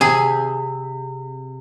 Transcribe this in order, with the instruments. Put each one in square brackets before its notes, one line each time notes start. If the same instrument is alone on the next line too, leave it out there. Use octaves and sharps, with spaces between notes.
[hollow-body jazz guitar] C3 [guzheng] G#4